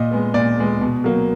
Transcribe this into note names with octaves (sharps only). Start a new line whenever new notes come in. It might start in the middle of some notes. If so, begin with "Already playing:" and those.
Already playing: A#2 D#5
G#3 B3
A#2 D5
G#3 B3
B2
F#3 A#3